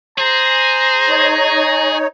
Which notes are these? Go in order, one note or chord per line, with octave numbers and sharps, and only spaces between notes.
G#4 C5 A#5
D#4 C#5